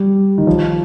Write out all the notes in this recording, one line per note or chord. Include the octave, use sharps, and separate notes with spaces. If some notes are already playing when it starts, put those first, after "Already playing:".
Already playing: G3
D#3
F3